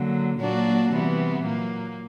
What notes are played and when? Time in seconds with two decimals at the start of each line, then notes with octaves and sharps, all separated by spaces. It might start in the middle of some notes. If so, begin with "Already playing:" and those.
Already playing: D3 F#3 A#3
0.39 A#2 F#3 A#3 D4 F#4
0.92 C3 E3 G3 B3
1.43 A#2 F#3 A#3